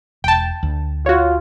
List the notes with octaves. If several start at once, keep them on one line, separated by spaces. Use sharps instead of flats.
E1 G5 A5
D2
F4 F#4 C#5